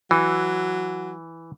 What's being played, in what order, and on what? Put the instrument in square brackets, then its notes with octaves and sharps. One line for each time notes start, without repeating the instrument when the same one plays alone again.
[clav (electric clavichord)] E3 [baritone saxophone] F#3